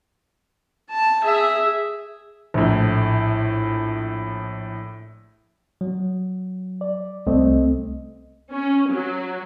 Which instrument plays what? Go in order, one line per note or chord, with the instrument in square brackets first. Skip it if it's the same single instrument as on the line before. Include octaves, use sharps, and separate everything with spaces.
[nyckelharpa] A5
G#4 E5
[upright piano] A#1 A2
[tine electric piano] F#3
[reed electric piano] D5
[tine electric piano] C2 [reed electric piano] A3 C4 D#5
[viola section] C#4
F#3